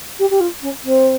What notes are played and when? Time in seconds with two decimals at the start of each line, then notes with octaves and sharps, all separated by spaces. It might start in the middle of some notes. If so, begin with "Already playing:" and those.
0.19 G4
0.30 G4
0.40 F4
0.62 C#4
0.84 C4